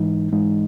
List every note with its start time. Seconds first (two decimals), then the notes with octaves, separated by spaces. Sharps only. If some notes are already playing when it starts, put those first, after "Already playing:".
Already playing: G#2 E3 G#3 D#4
0.31 G#2 E3 G#3 D#4